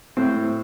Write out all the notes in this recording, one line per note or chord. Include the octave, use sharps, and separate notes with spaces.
A2 C4